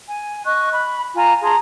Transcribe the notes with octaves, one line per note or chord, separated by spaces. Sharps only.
G#5
D#5 C#6 F#6
B5
F4 G#5 A#5
G#4 A5 A#5 C6